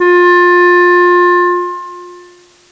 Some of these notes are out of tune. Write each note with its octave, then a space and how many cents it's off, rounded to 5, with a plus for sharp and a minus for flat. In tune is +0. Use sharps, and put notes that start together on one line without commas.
F4 +25